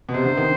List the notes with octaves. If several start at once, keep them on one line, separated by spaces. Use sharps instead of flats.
B2
C3 C5
D3
D#3